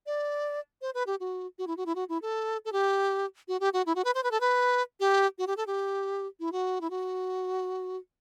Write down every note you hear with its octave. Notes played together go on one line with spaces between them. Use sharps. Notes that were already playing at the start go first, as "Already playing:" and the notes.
D5
C5
B4
G4
F#4
F#4
E4
F#4
E4
F#4
E4
A4
A4
G4
F#4
G4
F#4
E4
F#4
B4
C5
B4
A4
B4
G4
F#4
G4
A4
G4
E4
F#4
E4
F#4